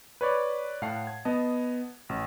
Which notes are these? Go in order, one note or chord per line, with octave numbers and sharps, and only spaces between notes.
B4 C#5 D5
A2 F5 F#5 A5 C7
G#6
B3 D#5 A5
A1